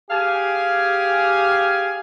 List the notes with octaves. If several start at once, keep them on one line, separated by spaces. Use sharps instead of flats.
G4 G#4 F5 G#5